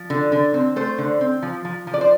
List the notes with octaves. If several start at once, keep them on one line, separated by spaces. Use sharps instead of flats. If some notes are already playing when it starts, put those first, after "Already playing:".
Already playing: F3
D3
D3
C4
A3 C5
D3
C4
F3
F3
F3
D5
C5